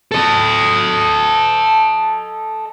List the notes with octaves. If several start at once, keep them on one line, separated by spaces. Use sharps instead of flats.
A4 D#5